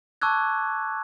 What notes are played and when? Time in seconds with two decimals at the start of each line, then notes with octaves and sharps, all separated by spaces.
0.22 A5 C#6 D6 E6 F#6 G#6